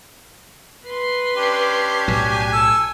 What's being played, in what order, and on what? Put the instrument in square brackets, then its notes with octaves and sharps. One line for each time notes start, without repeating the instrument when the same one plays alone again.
[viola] B4 C6
[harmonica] C#4 D4 G4
[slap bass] B1 A2 F#3 [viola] G#5
[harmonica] A4 E6